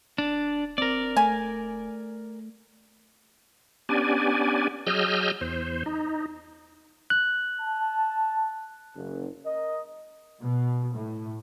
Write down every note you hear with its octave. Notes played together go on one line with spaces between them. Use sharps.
D1 D4
C4 A#4 D5
A3 G#5
B3 C#4 D4 G4 D5 G#5
F#3 G#4 D#5 E6 F6 G6
E2 C5
D#4
F#6
A5
F#1
A#4 D#5
B2
A2